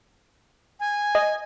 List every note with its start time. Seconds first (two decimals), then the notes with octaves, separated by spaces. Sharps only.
0.80 G#5
1.15 D#5